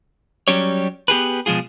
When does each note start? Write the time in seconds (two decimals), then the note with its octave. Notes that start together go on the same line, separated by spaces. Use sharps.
0.48 F#3 G3 C#4 G4 C#5
1.08 B3 G4 G#4 B4
1.46 B2 F3 G#3 F4 G#4